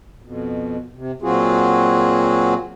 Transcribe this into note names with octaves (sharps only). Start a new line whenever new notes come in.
F2 B2
C3
A#2 F#3 C4 F4 F#4 G#4